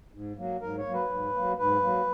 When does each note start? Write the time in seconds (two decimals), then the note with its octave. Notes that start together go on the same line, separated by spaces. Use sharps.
0.13 G#2
0.38 F#3 A#3
0.62 G#2 A#4
0.78 C#5
0.86 F#3 A#3
0.94 B4
1.10 G#2
1.34 F#3 A#3
1.59 G#2 B4
1.82 F#3 A#3